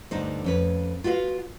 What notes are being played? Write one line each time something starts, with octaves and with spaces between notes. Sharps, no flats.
D2 G2 D3 D#4 C5
F2 C#4 B4
F4 F#4 B4 D#5 F5